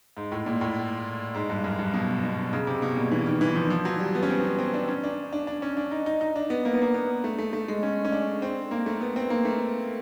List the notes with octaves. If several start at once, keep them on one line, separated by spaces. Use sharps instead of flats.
G#2
A2
A#2
A2
G#2
G2
F#2
G2
B2
B2
C#3
C3
B2
A#2
E3
D#3
E3
F3
F3
F#3
G3
B3
C#4
C4
B3
C4
D4
C#4
D4
D4
D4
C#4
D4
D#4
D#4
D#4
D4
B3
A#3
B3
A#3
B3
A3
A3
A3
G#3
C#4
C#4
D4
C4
A#3
A3
B3
C4
A#3
A3